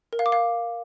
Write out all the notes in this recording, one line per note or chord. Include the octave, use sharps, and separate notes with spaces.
A#4
F5
D6
F5